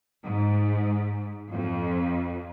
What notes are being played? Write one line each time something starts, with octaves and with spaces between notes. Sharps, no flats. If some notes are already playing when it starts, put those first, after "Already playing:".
G#2
F2